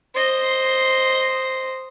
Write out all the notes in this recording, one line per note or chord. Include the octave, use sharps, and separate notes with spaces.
C5 D#5